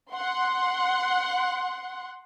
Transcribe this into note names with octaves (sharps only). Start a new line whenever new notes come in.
F#5 C6